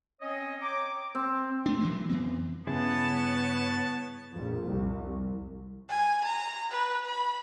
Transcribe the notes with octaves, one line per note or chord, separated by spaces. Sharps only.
C4 C#4 C#5 D#5
C#5 G5 A#5 D6
C4
A3 D4
E3 F#3 A#3
F2 E3 B3 C4
G2 C#3 B3 E4 G#4 B4 C#5 A5
A#1 F2
C2
G#5
A#5
B4
B5